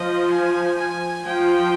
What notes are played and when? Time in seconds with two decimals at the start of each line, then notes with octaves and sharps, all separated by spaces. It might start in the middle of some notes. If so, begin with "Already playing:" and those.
Already playing: F3 D#5
0.31 G#5
0.78 G#5
1.26 F3 G5